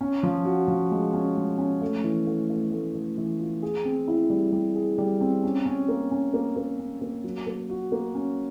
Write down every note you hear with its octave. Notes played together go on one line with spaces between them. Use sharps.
C#4
F3
F#4
F3
G#3
C#4
G#3
C#4
A3
E3
A3
A3
A3
A3
E3
F4
G#4
C4
E4
G3
G3
G#4
G3
C4
C#4
C#4
A#3
C#4
A#3
A#3
C#4
A#3
F#3
A#3
F#4
A#3
C#4